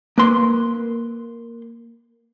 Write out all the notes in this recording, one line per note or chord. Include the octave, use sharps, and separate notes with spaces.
A#3 B4 C6